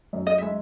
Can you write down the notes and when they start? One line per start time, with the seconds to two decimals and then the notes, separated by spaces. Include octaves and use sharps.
0.13 F#2
0.27 D#5
0.38 G#3 E5